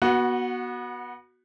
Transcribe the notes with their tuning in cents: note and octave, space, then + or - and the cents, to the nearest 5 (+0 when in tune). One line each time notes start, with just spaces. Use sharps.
B3 -25 F#4 +0